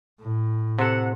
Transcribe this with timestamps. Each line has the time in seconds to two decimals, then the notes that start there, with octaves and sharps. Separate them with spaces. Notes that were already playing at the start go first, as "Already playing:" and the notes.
0.19 A2
0.79 C3 A4 F#5